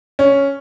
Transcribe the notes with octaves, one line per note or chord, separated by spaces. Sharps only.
C#4